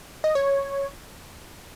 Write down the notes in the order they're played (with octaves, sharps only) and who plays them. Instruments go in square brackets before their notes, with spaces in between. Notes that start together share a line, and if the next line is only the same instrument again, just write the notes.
[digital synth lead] D#5
C#5